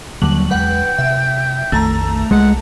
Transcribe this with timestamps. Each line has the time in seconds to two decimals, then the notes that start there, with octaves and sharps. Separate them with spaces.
0.22 D#2 D3 F#3 G3 A#3 F#7
0.51 E2 G#3 B4 F#5 G5
0.98 C3 E5
1.72 A#1 F2 D#3 A3 A5 A#5
2.31 C2 G#3 F#5